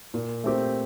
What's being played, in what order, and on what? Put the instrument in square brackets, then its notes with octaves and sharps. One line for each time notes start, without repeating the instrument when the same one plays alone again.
[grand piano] A#2
A3 C4 G4